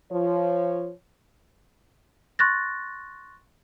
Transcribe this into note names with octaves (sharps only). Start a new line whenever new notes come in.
F3 F4 C#5
C6 C#6 F#6 A6 A#6